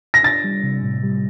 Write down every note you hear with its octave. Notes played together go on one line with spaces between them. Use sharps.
A#6
D4 A6
G3
C3
A2
G3